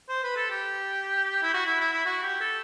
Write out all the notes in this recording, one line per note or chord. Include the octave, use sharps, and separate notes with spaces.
C5
B4
A4
G4
E4
F#4
E4
E4
E4
F#4
G4
A4